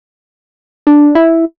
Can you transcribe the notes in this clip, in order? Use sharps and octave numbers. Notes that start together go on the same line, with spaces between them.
D4
E4